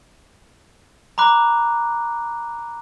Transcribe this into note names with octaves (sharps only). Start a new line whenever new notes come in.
A#5 B5 D6 F#6